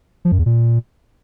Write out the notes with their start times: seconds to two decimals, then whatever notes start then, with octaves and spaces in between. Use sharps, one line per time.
0.25 F3
0.32 F#2
0.39 E2
0.46 A#2